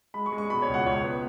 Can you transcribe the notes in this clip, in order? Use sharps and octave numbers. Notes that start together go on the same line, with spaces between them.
G#3 B5
C#6
G#3
C#6
B2 B5
C#5
C#2
F#5
C#2 C#5
B3